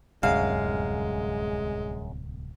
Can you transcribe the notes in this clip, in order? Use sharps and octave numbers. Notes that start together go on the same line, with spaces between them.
D1 C2 F#2 G#3 F5